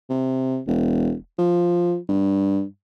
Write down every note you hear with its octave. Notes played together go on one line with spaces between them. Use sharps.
C3
E1
F3
G2